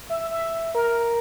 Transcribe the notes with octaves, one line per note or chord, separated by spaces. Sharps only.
E5
E5
E5
A#4